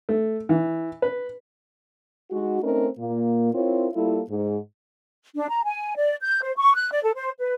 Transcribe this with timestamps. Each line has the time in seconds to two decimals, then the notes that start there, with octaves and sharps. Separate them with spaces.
0.09 A3
0.49 E3
1.02 B4
2.31 G#3 D#4 F#4
2.62 A3 C4 C#4 D#4 A#4
2.97 A#2 A#3
3.52 C4 E4 F4 A#4 C#5
3.93 G3 A#3 E4 F4 A4
4.29 G#2
5.35 D4
5.49 A#5
5.64 G#5
5.96 D5
6.23 G6
6.42 C5
6.57 C#6
6.75 F#6
6.92 D5
7.04 A4
7.15 C5
7.40 B4